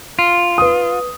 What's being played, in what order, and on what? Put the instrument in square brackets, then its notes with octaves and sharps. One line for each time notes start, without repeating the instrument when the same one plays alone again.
[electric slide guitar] F4
[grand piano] B4 D#6